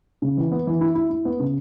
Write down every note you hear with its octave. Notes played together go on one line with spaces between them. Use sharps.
C#3
E3
B3
E3
E4
E4
E4
B3
C#3